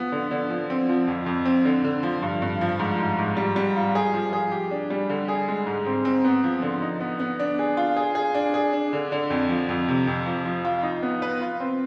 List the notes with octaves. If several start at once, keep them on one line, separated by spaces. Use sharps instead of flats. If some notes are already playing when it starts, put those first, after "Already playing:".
Already playing: F3 B3
D3
D3
F3
C4
F3
F2
F2
C4
D3
D3
F3
G2
G2
F3
G#2
G#2
G#2
G3
G3
F4
G#4
F3
G#4
G4
D4
G3
D3
G#4
G#3
G#2
C4
C4
B3
F3
D3
D#4
B3
B3
D4
G#4
F4
G#4
G#4
D4
G#4
D4
D3
D3
F2
F3
F2
C3
F2
F3
F3
F4
D#4
B3
B4
F4
C4